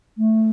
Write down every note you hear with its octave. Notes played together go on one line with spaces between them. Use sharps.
A3